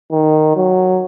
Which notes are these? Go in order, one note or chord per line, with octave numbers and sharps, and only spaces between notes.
D#3
F#3